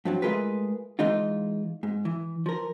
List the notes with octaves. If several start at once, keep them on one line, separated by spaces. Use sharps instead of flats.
G2 F3 F#3
G#3 A3 F4 G#4 A#4 B4
E3 G#3 D#4 F4
G#2
E3
F3 A#4